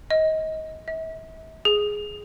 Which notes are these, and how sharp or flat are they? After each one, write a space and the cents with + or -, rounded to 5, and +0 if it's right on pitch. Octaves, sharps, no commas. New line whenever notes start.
D#5 +25
E5 -40
G#4 +0